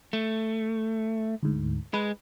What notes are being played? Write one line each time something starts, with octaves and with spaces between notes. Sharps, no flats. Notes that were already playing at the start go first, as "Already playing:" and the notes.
A3
D2 G#2
G#3 B4